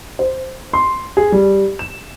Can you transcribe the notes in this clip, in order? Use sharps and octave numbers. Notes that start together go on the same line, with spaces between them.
C5
C6
G#4
G3
E7